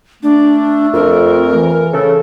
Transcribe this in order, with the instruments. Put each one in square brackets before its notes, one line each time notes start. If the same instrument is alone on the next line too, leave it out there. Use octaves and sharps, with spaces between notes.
[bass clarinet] A3 [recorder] D4
[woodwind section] F2 [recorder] A#4
[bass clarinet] E3
[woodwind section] C#3 A4